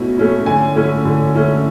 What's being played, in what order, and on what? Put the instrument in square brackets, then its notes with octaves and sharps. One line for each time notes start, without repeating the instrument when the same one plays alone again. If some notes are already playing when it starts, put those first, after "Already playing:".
Already playing: [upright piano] B2 A3 C#4 E4
A3 C#4 E4
D3 G#5
A3 C#4 E4
D3
A3 C#4 E4